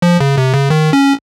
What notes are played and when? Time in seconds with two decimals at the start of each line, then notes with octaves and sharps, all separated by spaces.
0.02 F3
0.21 C#3
0.37 C3
0.54 C#3
0.70 D#3
0.93 C#4